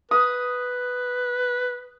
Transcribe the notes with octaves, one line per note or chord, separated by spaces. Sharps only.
B4 D#6